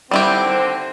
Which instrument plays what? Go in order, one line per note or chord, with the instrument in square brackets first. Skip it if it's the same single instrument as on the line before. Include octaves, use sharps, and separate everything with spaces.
[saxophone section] D3 D#3 C4 [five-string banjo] G3 E4 G4